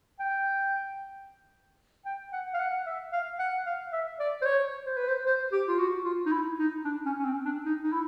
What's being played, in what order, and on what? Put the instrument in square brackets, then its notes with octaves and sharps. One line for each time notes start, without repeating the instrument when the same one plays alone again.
[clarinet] G5
G5
F#5
F5
F#5
E5
F5
F#5
F5
E5
D5
C5
C#5
C5
B4
C5
C5
G4
F4
F#4
F4
D#4
E4
D#4
D4
C#4
C#4
C4
D4
D#4
D#4
E4